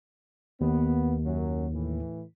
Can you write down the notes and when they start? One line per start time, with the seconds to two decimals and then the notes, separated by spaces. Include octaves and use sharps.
0.61 D#2 B3
1.25 F#2 F#3
1.74 A2 E3